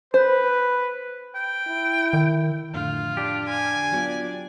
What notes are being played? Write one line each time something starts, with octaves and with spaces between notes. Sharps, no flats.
B4 C5
G5
E4
D#3
F2 A2 D3 F4
D4 G4
G#5
F#3 B3 F4 D5